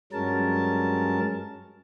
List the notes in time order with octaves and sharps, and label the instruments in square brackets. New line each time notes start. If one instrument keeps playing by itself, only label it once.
[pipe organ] G2 F#3 G#3 C#4 A#4 A5